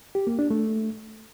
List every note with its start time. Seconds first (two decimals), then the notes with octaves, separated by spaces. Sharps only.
0.15 G4
0.27 A#3
0.39 D4
0.51 A3